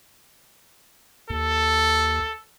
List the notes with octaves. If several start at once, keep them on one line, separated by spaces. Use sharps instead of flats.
D#2 A4